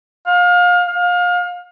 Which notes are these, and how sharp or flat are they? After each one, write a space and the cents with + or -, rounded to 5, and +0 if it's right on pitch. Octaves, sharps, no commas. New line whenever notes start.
F5 +30
F5 +30